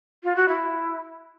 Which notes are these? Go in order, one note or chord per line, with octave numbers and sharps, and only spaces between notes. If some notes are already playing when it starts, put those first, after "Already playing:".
F4
F#4
E4